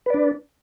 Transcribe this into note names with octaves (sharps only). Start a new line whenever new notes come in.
D4 B4 D5